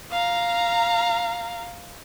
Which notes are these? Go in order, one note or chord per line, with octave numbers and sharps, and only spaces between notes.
F5 A#5